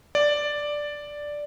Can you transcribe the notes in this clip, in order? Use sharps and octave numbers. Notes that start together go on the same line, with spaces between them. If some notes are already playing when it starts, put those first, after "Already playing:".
D5